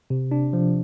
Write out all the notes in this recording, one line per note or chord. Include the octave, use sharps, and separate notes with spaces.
C3
D4
F3